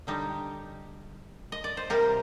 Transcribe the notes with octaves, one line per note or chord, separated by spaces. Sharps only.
D3 G3 D#4 G4
D#5
D5
C5
C3 G3 G4 A#4